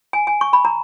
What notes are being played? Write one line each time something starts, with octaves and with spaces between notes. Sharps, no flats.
G#5
G#5
C#6
B5
A#5